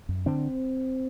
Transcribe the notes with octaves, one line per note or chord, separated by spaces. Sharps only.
F#2
D3 C4